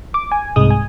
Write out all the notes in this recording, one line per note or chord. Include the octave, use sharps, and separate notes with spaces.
D6
G#5
C2 G#2 G#3 D#6
G#5